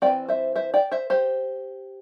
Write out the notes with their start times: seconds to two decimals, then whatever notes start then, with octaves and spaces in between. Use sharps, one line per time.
0.02 E3 C4 D5 G5
0.28 C5 E5
0.55 C5 E5
0.74 D5 G5
0.92 C5 E5
1.10 G4 C5